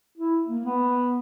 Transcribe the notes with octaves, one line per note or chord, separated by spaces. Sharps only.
E4
A#3
B3